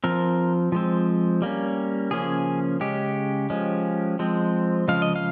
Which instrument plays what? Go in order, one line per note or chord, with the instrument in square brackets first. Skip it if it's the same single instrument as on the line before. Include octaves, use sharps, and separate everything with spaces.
[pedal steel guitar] F3 C4 A#4
F3 G#3 C4
G3 A#3 C#4
C#3 F3 A#3 C#4 G#4
C#3 G#3 C#4 G4
F3 G#3 C#4
F3 G#3 C4
C#3 F3 G#3 F5
D#5
F5